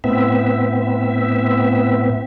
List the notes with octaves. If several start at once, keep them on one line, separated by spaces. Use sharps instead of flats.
A2 B3 C4 E5